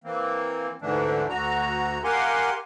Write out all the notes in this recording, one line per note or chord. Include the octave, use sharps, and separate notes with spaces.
E3 A#3 C4
D2 G#2 D3 E3 A3 D4
D2 F#4 A#5
G4 A#4 F5 F#5 G#5 C6